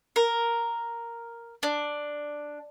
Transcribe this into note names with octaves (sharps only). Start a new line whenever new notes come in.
A#4
D4